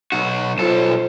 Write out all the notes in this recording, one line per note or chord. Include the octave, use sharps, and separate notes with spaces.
B1 F#4
B1 F4 A4 C5